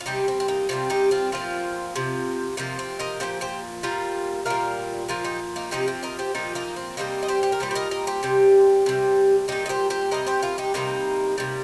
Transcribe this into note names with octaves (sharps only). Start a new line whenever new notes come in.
F4
C3 G3 D#4 G4
C4
C4
A#3 D#4
C3 D#3 G3 C4 F4
D#4 G4
C4 F4
A#2 F3 C4 F4
C3 F3
C3 F3 A#3 D#4
C4
A#4 D#5
A#2 F3 G4 C5
G4 C5
A#2 G3 F4 A#4
A#2 G3 F4 A#4
A#2 F3 F4 A#4
D#4 G4
A#3 D#4
C3 F3 D#4 G4
C4
A#4 D#5
G4 C5
A#2 F3 D#4 G4
A#3 D#4
C4
C3 D#3 G3 A#3 D#4
D#5
G4 C5
G4
A#4
A#2 G3 G4 C5
C5
A#4 D#5
A#4 D#5
G4 C5
C3 G3
C3 G3
A#2 G3 D#4 G4
D#5
G4 C5
G4 C5
C3 G3 A#4 D#5
G4 C5
F4 A#4
D#4 G4
C3 D#3 G3 A#3 D#4
C3 G3